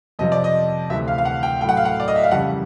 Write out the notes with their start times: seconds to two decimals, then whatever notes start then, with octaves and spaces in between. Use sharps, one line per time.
0.19 F2 C3 F3 D#5
0.32 D5
0.44 D#5
0.90 D2 C3 E3 E5
1.08 F5
1.18 F5
1.25 F#5
1.43 G5
1.61 A2 G5
1.64 F#3 F#5
1.77 F5
1.85 F#5
2.00 D5
2.08 D#5
2.16 E5
2.24 F5
2.31 F2 C#3 E3 G3 F#5